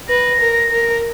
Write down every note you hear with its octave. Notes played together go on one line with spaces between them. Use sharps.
B4 A#6
A#4
A#4